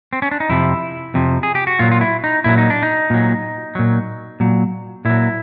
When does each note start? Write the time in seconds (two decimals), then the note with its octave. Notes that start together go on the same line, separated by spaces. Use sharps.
0.13 C4
0.22 C#4
0.31 D4
0.40 D#4
0.49 F2 C3 F3 E4
1.14 F2 C3 F3
1.43 G#4
1.55 G4
1.67 F#4
1.79 A#2 F#3 F4
1.91 F4
2.01 E4
2.24 D#4
2.44 A#2 F#3 E4
2.58 D#4
2.70 D4
2.83 D#4
3.10 A#2 F#3
3.75 A#2 F#3
4.40 A#2 F#3
5.05 A#2 F#3 E4